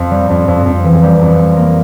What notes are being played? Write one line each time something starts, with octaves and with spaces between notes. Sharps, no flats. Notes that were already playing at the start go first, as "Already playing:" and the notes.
Already playing: F2
G3
F2
F2
F2
E3
G3
F2
G3
A#3